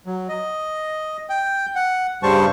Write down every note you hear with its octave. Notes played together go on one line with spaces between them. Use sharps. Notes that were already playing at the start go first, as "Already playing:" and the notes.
F#3
D#5
G5
F#5
G2 C#3 G3 C5 A5 C#6